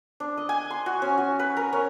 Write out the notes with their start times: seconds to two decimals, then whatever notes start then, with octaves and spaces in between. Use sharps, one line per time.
0.20 D4
0.37 D#5
0.49 G#5
0.70 C6
0.86 F#4
1.02 C#4
1.18 F#4
1.39 B4
1.57 A#4
1.73 C#4